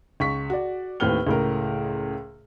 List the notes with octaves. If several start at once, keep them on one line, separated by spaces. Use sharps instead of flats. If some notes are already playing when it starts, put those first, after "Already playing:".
C#2 C#6 B6
F#4 D5
D#2 A2 C4 B4 F6 G7
C#2 A2 A#4